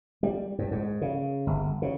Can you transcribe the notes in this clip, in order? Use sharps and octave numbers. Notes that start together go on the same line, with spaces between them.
G3
G2
G#2
C#3
G1
C#3